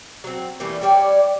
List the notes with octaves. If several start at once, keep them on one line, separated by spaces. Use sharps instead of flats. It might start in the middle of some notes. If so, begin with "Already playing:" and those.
F#3 C4
E3 G3 A3 A#3
G3 G4 C#5 D5